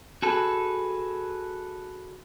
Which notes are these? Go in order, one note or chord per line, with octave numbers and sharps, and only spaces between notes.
F#4 G#4 A4 B4